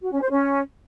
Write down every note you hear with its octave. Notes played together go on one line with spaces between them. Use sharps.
F#4
C#4
C5
C#4